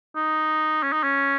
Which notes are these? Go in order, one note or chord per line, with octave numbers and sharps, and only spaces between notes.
D#4
C#4
D#4
C#4